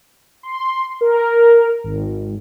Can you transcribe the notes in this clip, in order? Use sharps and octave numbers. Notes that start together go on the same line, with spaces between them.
C6
A#4
G#1